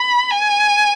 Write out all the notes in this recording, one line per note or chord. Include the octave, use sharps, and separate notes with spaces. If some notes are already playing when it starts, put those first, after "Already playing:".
Already playing: B5
G#5